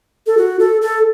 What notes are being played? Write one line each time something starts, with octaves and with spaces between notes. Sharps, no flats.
A4
F#4
A4
A4